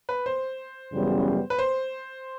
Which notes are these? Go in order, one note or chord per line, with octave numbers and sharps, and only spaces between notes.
B4
C5
F#2 C#3 E3 G3 B3
B4
C5